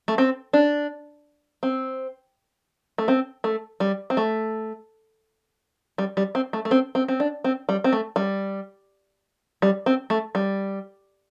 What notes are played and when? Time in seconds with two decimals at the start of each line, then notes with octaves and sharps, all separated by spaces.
0.08 A3
0.18 C4
0.53 D4
1.63 C4
2.98 A3
3.08 C4
3.44 A3
3.80 G3
4.10 C4
4.17 A3
5.98 G3
6.17 G3
6.35 C4
6.53 A3
6.65 A3
6.71 C4
6.95 C4
7.08 C4
7.20 D4
7.44 C4
7.69 G3
7.84 C4
7.93 A3
8.16 G3
9.62 G3
9.86 C4
10.10 A3
10.35 G3